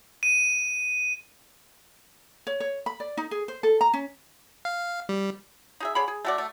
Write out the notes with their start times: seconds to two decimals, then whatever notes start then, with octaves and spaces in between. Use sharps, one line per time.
0.23 D#7
2.47 C#5
2.60 C#5
2.86 B5
3.00 D5
3.17 D#4
3.31 G#4
3.48 C5
3.63 A4
3.81 A#5
3.93 C#4
4.65 F5
5.09 G3
5.80 D#4 G#4 E5
5.95 D3 G#4 C#5 B5
6.08 G#4
6.25 A3 F#4 D5
6.38 A3